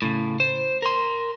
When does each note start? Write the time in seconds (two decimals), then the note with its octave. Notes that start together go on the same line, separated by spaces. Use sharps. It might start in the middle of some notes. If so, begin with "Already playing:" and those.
0.02 A2 C#3
0.40 C5
0.82 A#4 C6